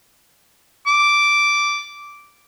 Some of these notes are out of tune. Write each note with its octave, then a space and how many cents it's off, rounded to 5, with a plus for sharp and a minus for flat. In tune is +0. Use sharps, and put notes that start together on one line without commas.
D6 -5